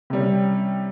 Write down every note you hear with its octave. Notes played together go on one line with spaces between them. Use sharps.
C3 G3 C#4